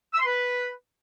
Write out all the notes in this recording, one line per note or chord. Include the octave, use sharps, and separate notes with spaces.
E6
C6
B4